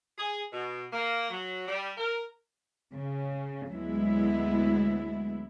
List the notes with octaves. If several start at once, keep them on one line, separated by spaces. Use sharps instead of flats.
G#4
B2
A#3
F#3
G3
A#4
C#3
D2 F#3 G#3 B3 E4